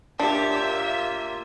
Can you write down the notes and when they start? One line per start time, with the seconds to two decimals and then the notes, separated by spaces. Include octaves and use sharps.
0.19 A2 A#3 D4 F4 G4 E5